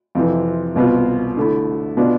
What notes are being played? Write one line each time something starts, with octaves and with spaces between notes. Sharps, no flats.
F2 C3 E3
C2 B2 B3 F4
D3 A3 E4
B2 B3 D4 F4